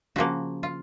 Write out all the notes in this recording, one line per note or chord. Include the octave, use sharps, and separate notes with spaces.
C#3 F3 A#3 F#4
F4